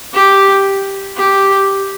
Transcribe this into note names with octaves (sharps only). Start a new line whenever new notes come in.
G4
G4